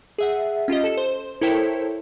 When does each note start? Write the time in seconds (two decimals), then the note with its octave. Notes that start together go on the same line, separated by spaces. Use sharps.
0.18 G#4 E5 F#5
0.68 C#4 F4 G4 D#5
0.84 A4
0.97 C5
1.41 E4 A4 A#4 C5 C#5 G5